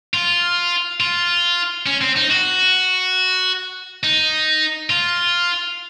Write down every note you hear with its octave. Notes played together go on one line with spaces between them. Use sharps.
F4
F4
C#4
C4
D#4
F#4
D#4
F4